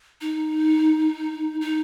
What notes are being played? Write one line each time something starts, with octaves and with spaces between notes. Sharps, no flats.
D#4
D#4